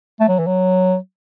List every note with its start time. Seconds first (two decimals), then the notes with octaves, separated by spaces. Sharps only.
0.20 A3
0.28 F#3
0.39 E3
0.47 F#3